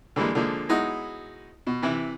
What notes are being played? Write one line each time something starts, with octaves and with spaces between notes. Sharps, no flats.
D3 E3 G3 G#3 A#3
D3 F3 G#3 A#3
F#3 G#3 B3 D#4 E4 F#4
B2
C3 E3 E4